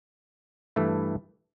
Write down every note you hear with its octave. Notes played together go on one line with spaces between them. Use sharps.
G2 E3 A3 E4